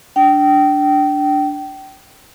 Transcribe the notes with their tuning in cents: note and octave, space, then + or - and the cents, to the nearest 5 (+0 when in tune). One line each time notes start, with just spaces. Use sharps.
D4 -5 G5 -25